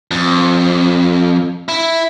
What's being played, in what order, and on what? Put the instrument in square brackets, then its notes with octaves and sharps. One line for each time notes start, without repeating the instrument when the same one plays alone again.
[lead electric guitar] F2
E4